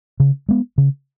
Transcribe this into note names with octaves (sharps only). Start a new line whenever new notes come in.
C#3
G#3 B3
C#3